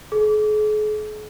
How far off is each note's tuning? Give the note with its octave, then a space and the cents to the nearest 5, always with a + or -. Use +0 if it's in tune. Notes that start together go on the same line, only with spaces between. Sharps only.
G#4 +45